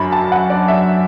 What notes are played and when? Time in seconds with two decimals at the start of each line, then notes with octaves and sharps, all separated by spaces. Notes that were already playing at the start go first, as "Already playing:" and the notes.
Already playing: F#2 F#3 D4 B5
0.12 A5
0.32 F#5
0.50 D5
0.68 E5